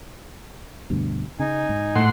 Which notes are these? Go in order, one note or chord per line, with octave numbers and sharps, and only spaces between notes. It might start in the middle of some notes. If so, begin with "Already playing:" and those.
D2 G2 B2
C#3 D#4 G#5
G#2
A2 F#5 C6